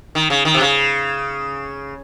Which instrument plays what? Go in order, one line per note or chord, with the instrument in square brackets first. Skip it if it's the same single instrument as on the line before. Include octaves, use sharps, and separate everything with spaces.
[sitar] D#3
C#3
D#3
C3
C#3